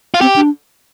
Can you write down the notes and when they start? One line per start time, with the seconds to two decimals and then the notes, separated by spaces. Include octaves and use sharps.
0.14 F4
0.21 C4 G4
0.36 D4